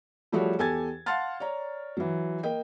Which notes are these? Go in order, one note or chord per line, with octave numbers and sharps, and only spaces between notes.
F3 G3 A3 F#4 G#4 C#5
E2 G4 A4 G#5 G#6 A6
F5 F#5 A5 C6 F6 A6
C#5 D5 A#5
E3 F#3
A#3 D#5 G5